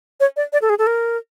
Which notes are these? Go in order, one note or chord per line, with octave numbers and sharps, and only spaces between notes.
C#5
D5
D5
A4
G#4
A4
A#4